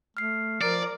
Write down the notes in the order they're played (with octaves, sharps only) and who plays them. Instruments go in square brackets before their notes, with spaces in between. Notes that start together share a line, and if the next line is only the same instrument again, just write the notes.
[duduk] A3 [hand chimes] F6 C7
[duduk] F3 [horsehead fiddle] A#4 [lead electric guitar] D5